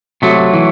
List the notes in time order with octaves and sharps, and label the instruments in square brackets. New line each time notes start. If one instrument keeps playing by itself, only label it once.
[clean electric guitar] C3 F#3 A3
E3